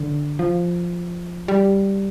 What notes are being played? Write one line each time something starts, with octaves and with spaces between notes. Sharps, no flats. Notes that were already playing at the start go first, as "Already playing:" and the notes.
Already playing: D3
F3
G3